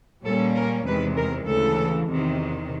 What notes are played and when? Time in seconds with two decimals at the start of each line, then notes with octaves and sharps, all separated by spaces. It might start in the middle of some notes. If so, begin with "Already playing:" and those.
0.24 A#2 G3 A#3 C#4 A4
0.55 A#4
0.86 E2 C3 D#3 G#3 B4
1.17 A#4
1.47 D2 C#3 E3 A4
2.09 E2 C3 D#3